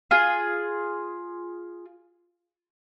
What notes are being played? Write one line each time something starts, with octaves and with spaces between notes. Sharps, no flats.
F4 G#4